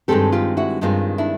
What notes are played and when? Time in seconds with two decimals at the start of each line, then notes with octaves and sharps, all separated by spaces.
0.08 G2 D#3 G#3 C4 G4 A4
0.32 F4 G4
0.57 E4 F#4
0.81 G2 D#3 G#3 C4 D#4 F4
1.18 D4 E4